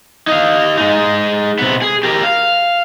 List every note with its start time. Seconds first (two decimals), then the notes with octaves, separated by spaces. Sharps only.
0.27 D#4 F5
0.77 G#3 D#4
1.59 C3 B3
1.82 G#4
2.03 G4 A#4
2.23 F5